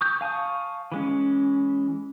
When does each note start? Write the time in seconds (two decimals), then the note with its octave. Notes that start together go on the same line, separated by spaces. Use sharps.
0.01 C#6 D#6 G6
0.21 F5 G#5 A5 C#6 D#6
0.92 E3 G#3 C#4